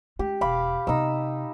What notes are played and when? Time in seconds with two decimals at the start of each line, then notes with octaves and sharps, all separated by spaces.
0.19 G#3 C#4 G4
0.41 E1 F5 B5 D6
0.87 C3 B3 D#4 E6